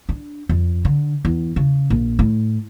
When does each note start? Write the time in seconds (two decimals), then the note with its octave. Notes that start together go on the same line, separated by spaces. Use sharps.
0.09 D4
0.49 F2
0.85 D3
1.25 E2
1.56 C#3
1.90 A#1
2.19 A2